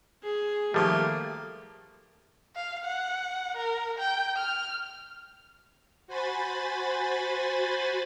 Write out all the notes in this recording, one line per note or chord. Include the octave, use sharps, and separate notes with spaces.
G#4
D#3 F3 G3 A3 A#3 G4
F5
F#5
A#4
G5
F6
F#4 C5 G#5 B5 A6